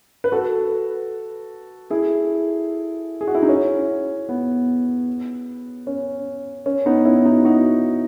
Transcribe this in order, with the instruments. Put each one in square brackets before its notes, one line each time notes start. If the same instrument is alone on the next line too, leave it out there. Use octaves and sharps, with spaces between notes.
[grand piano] B4
F#4 A4
E4 G#4
G#4
F#4
E4
D#4
C#4
B3
C#4
C#4
B3 D#4
C#4 E4
D#4 F#4
D#4 F#4